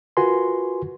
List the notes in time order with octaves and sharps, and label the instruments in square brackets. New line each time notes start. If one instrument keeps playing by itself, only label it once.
[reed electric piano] F4 F#4 A#4 B4 G#5 C6